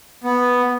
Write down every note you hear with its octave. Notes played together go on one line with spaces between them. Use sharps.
B3